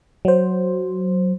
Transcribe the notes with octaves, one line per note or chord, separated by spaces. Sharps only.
F#3 C5